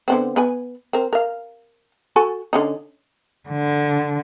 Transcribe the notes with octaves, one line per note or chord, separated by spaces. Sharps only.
D3 B3 C4
B3 B4 G#5
C4 A#4
A#4 F5
F#4 A4 G#5
D3 C#4 D#4
D3